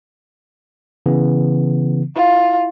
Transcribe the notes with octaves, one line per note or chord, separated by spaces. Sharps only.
C#3 E3 B3
E4 F4